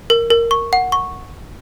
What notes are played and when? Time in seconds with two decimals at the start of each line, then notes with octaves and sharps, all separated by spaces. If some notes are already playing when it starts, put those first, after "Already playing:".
0.10 A#4
0.30 A#4
0.51 C#6
0.73 F#5
0.92 C#6